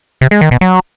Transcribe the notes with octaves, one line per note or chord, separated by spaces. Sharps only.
C3
G#3
D#3
B2
F#3